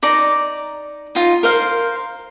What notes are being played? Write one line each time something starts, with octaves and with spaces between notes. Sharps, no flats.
D#4 D5 A#5
D#4 F4
A#4 C5 F5